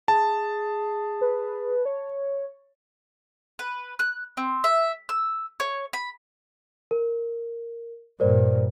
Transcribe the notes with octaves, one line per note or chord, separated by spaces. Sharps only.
G#4 A5
B4
C#5
B4
F#6
C4
E5
E6
C#5
B5
A#4
G2 A#2 A#4 C5 D5